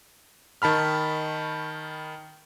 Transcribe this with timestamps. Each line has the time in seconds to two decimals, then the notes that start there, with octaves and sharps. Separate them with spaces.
0.62 D#3 A5 B5 F6